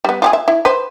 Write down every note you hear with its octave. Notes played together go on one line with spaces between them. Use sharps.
G3 B3
F4 G4 G#4
E5
E4
B4 C5